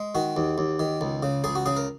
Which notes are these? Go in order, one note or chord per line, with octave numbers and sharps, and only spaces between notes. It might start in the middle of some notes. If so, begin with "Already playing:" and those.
Already playing: G#3
D#3 F#4
D#2
D#2
D#3
C#2
C#3
C#2 G#4
F#4
C#3 G#4
A#4